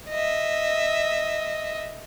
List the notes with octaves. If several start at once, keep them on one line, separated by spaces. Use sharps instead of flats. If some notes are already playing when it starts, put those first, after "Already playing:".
D#5 E5